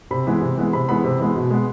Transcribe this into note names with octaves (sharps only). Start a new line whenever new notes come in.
C3 B5
E3 G#3 B3
C3
E3 G#3 B3
C3 B5
E3 G#3 B3 B5
C3
E3 G#3 B3
B2
G#3 B3